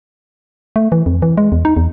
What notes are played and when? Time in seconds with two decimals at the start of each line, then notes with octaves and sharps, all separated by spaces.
0.76 A3
0.92 E3
1.06 F2
1.22 E3
1.37 G#3
1.52 E2
1.65 D#4
1.77 E2